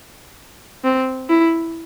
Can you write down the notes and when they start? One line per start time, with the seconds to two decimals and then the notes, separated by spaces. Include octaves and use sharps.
0.84 C4
1.30 E4